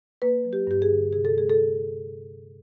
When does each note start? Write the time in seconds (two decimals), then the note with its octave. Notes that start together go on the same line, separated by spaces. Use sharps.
0.22 A#3 B4
0.45 F#3
0.53 G4
0.67 G2 G4
0.82 G#4
0.91 D3
1.13 C3 G#4
1.25 A4
1.35 G#3 G#4
1.50 A4